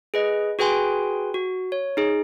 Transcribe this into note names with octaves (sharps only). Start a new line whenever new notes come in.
G#4 B4 D#5
F#4 G#4 B4 G5 G#5 C6
F#4
C#5
D#4 G#4